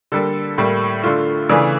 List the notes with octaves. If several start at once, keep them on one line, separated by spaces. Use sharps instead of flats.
D3 G3 A#3 A4
A2 G3 A#3
D3 A3 F4
C#3 E3 A3 D4